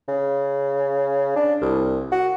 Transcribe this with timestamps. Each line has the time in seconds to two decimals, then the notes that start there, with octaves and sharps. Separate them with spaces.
0.08 C#3
1.36 D4
1.62 C2
2.12 F#4